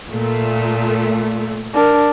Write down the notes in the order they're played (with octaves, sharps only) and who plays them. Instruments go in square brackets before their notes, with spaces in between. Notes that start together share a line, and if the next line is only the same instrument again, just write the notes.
[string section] A#2 A3
[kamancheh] D4 A#4